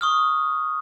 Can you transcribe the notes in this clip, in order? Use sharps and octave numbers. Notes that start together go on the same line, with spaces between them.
C#6 D#6 F6